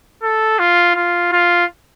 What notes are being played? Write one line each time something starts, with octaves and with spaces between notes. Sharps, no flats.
A4
F4
F4
F4